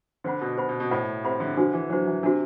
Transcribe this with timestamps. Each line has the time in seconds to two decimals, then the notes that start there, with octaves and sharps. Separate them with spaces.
0.24 D3 C5 F#5 B5
0.41 B2
0.58 B2 C5 F#5 B5
0.69 B2
0.80 B2
0.91 A2 C5 F#5 B5
1.24 C3 C5 F#5 B5
1.40 D3
1.57 D3 D4 F#4 C5
1.73 E3
1.90 F#3 D4 F#4 C5
2.07 E3
2.23 C3 D4 F#4 C5